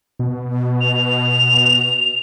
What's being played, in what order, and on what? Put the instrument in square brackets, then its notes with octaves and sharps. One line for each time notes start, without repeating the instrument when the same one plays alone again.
[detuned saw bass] B2
[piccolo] F7